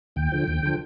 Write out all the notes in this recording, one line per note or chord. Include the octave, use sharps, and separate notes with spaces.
D#2 G5
D3 F3
D#2
D3 F3